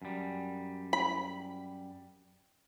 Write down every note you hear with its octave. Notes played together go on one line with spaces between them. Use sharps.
F#2 G3
B5